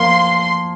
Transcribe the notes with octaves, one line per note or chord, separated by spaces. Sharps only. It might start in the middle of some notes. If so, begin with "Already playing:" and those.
Already playing: F3 A#3 C6